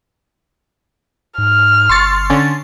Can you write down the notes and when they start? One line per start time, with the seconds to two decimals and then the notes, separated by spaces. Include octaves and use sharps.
1.38 G#2 F6
1.89 G1 C6 C#6 A6
2.30 D3 C#4